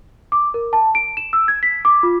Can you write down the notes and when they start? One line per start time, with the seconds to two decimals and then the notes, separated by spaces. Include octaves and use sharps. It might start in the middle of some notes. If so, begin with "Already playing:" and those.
0.32 D6
0.54 A#4
0.73 A5
0.95 D7
1.17 E7
1.33 E6
1.48 G#6
1.63 B6
1.85 D6
2.03 F4